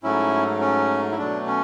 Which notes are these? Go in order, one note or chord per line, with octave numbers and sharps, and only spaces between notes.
G#2 F#3 A3 C#4 E4
C#4
E4
B2 F#3 A3 D4
C#4